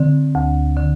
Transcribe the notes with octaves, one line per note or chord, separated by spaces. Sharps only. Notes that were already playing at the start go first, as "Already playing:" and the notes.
Already playing: D3 C4
D2
D3